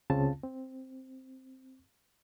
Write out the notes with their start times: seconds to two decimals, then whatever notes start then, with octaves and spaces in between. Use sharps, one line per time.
0.10 C#2 C#3 C4 F4 A5
0.43 C4